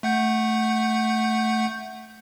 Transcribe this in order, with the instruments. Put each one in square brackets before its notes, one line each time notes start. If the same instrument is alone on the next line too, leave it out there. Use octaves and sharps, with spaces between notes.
[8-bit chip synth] A3 F#5 G6